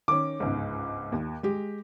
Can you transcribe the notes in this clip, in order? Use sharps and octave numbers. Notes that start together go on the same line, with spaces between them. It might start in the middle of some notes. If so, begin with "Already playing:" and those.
D#3 C#4 D6
G1 C#2 G#2
D#2
G#3 G4